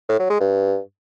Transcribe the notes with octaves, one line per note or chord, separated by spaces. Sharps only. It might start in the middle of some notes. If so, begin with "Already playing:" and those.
A2
F#3
G#3
G2